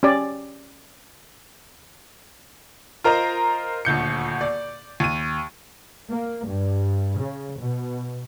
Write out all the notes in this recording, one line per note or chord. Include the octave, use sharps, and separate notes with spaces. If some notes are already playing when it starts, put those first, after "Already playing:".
C#4 G4 D5
F4 A#4 C5 D#5 A#5
D#1 D2 G6 C#7
D5
D#2 D#7
A#3
G2
C#3
B2